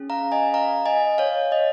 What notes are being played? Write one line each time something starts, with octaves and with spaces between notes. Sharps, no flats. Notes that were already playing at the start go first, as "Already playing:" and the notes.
Already playing: C#4 G#4
F5 A#5
D#5 G#5
F5 A#5
D#5 G#5
C#5 F5
D#5